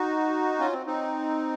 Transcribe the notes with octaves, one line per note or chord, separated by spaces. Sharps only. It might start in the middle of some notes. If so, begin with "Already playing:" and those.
Already playing: D#4 F#4
C#4 F4
C4
C4 D#4